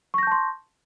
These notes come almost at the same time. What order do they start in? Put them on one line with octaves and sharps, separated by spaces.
C#6 A#6 G6 A5 C6